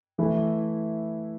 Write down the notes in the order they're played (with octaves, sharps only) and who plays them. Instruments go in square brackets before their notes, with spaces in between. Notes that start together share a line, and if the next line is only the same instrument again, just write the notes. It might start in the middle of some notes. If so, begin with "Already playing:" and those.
[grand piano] E3 A3 E4